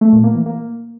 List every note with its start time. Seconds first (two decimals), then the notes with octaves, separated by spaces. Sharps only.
0.01 A3
0.12 A#2
0.24 A#3
0.35 E3
0.46 A#3